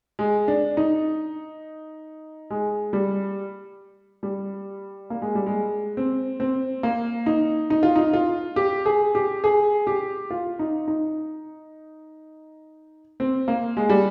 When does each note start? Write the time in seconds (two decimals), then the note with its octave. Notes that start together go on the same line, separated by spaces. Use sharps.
0.19 G#3
0.48 D4
0.77 D#4
2.51 G#3
2.93 G3
4.23 G3
5.10 A#3
5.22 G#3
5.35 G3
5.46 G#3
5.97 C4
6.40 C4
6.83 A#3
7.26 D#4
7.70 D#4
7.83 F4
7.96 D#4
8.13 F4
8.56 G4
8.86 G#4
9.15 G4
9.44 G#4
9.87 G4
10.30 F4
10.59 D#4
10.88 D#4
13.20 C4
13.48 A#3
13.77 G#3
13.89 G3